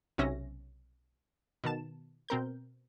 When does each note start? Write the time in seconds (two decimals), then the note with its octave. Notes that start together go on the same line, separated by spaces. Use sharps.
0.18 B1 C3 C#4 E5 A#6
1.64 B2 D#3 A5 E7
2.29 B2 C4 A#4 G6